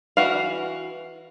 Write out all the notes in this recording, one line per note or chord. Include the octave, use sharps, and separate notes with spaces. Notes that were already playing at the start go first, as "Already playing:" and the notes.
E3 F#4 F5